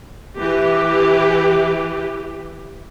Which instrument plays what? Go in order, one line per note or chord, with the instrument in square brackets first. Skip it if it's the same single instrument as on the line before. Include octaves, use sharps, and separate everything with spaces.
[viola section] E3 G4